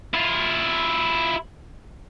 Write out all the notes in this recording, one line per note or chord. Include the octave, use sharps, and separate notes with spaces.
E4 F4